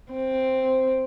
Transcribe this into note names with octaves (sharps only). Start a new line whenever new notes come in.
C4